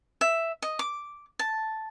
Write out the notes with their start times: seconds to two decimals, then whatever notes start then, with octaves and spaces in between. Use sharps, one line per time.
0.21 E5
0.62 D#5
0.79 D6
1.39 A5